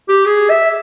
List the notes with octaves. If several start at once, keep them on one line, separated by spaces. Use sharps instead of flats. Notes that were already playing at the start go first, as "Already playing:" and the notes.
G4
G#4
E5